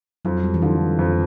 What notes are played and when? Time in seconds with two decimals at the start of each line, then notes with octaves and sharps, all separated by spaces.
0.25 F2 F#3
0.44 G3
0.54 E3
0.62 D3 D#3 F3
0.99 F2